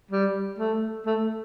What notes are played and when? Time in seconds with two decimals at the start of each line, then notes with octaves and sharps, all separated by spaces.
0.11 G3
0.58 A3
1.06 A3